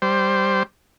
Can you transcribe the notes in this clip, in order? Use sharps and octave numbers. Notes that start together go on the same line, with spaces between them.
G3 C5